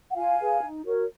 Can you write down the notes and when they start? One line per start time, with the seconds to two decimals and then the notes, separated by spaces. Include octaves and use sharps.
0.10 F#5
0.16 F4 F5 G#5
0.39 G#4 B4
0.62 D#4
0.85 F#4 A#4 C#5